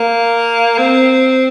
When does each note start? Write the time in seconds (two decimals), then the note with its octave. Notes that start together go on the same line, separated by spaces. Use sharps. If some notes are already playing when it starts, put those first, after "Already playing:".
Already playing: A#3
0.78 C4